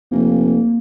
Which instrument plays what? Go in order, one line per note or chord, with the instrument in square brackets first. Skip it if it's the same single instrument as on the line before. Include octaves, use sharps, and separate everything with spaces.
[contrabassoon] F1 [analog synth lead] A#3